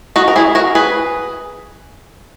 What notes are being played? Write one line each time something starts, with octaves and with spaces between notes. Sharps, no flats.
D#4 F#4
A#4
E4 G#4
F#4 A#4
G#4 B4